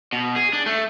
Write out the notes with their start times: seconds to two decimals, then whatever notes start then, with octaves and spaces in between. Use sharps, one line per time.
0.13 B2
0.36 G#4
0.53 D4
0.66 A3